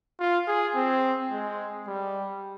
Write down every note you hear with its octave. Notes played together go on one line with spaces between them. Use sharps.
F4
G#4
C4
G#3
G3